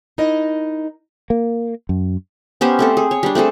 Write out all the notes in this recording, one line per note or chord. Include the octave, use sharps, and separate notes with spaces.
D#4 E4 A#4 D#5
A#3
F#2
B3 C#4 G4 C5
A3 C4 A4
G#4
C#5
G3 D4
A3 C4 G#4 A4